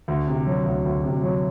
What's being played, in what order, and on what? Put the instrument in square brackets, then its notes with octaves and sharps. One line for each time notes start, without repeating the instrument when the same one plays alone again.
[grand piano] D2
C3
F#3
D2
D2
C3
F#3